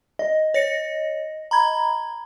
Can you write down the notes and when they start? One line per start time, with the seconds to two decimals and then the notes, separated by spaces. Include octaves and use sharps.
0.19 D#5
0.54 C#5 A#6 C#7
1.51 A#5 B5 G#6